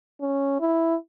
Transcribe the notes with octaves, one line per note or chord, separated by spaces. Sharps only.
C#4
E4